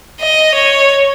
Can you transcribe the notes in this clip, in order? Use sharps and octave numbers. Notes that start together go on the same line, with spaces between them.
D#5
C#5